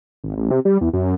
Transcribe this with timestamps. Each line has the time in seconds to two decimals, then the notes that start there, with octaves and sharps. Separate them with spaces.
0.24 G#1
0.37 A1
0.51 C3
0.65 G3
0.81 E2
0.93 F#2